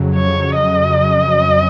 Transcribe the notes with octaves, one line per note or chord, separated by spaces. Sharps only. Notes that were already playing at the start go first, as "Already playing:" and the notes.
Already playing: F2 C#3 F#3
C#5
D#5